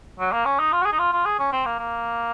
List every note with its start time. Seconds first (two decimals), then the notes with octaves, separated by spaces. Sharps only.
0.19 F#3
0.32 A#3
0.45 C#4
0.59 D#4
0.72 F4
0.82 F#4
0.85 G#4
0.92 D#4
0.98 F4
1.12 F4
1.26 G#4
1.39 C#4
1.52 C4
1.65 A#3
1.79 A#3